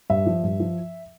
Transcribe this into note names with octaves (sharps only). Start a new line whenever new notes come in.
G2 E5
F3
G2
F3